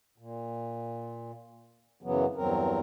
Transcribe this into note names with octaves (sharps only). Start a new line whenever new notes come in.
A#2
F#2 C#3 E3 F#3 B3
E2 G2 F#3 C4 A#4